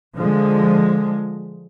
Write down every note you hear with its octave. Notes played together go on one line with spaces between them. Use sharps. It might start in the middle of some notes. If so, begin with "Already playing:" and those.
D3 F3 G#3